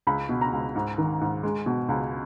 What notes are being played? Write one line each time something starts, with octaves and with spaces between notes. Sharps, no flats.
C#2 B5
B2
A#5
C#2
G#2
D#3
G#2
G#3
B2
C#2